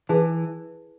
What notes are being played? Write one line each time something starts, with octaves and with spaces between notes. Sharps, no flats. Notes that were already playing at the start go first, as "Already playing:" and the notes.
E3 E4 G#4 B4 E5 A5